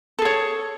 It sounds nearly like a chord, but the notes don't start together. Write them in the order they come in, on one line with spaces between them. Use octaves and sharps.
A4 G#4 C#5